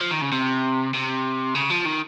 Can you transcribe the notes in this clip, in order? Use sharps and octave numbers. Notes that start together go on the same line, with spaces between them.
F3
D#3
C#3
C3
C3
C#3
F3
D#3